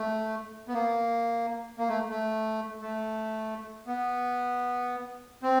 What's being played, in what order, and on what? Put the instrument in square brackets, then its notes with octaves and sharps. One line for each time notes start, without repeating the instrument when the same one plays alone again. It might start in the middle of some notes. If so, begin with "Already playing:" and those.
Already playing: [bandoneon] A3
B3
A#3
A#3
A3
A3
A3
B3
C4